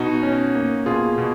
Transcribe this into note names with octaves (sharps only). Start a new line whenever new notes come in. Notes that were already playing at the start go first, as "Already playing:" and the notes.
Already playing: B2 D#4 F#4
C#4
A#3
B2 F4 G#4
B2